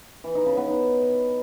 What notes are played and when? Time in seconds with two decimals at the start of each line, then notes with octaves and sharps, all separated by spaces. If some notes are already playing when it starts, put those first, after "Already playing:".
0.24 E3
0.35 D#4
0.46 C#3
0.57 B3
0.68 D#4